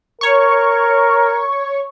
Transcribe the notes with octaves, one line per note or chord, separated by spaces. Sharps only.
A#4 C#5 C#6